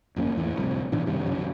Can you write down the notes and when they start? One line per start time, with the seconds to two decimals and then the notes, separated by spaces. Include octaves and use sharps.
0.16 G1 F2 A#3 C#4
0.35 A1 E2 E3
0.56 D1 C2 F2
0.92 G#2 B2 E3 D4
1.06 F#2 C3 D#3 G3
1.26 F#1 B1 C#3 F#3